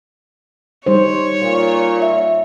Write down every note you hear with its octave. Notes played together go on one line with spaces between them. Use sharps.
G3 D#4 C5 C#5
A#2
E5